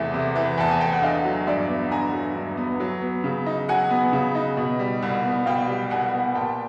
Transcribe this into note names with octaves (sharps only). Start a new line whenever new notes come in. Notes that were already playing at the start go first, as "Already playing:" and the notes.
Already playing: E2 C3 E3 A3
C3
E3
E2 A5
G#5
A3 G5
F#5
D3 D#5 F5
F#3
G2 D5 E5
B3
D3 G#5 A#5
F#3
G2
B3
F#3
B3
C#3
D#4
F#3 F#5 G#5
B3
C#3
D#4
B2
G3
C2
B3
B2 F5 G5
G3
C2 F#5 G#5
B3
A#2 G5 A5